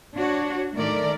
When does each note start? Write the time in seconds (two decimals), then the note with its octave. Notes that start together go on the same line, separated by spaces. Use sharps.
0.15 D4 F#4 C#5
0.74 A2 D#3 A3 A#4 D5